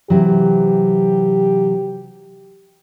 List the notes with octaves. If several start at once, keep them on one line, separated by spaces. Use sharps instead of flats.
C3 E3 F#3 G4